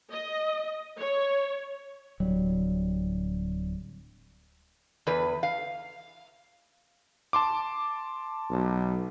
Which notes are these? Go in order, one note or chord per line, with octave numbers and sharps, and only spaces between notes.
D#5
C#5
D1 F#3 G3
E2 B4
F5
A5 C6 D6
B1